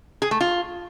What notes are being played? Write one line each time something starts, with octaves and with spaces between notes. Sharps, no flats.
G#4
A3
F4